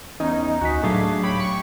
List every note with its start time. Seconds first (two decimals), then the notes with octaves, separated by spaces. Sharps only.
0.20 E2 C#4 D#4
0.61 D2 F#4 G#5 B6
0.83 A2 F#3 A3 D4 G#4 F5
1.24 G4 C#5 B5
1.40 C#6